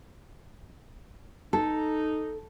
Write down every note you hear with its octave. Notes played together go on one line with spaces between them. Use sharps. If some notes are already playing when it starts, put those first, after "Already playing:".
D#4 A4